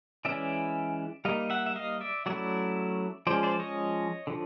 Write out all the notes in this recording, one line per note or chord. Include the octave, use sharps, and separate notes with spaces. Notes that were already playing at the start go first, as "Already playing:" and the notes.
E3 G#3 C#4 E4 D5 E5
G3 A#3 D#4 D#5 F5
E5 F#5
E5
D#5 F5
D5 E5
F#3 A3 C#4 E4 D5 E5
F3 G#3 C#4 C5 D5
C5 D5
C#5 D#5
D3 F3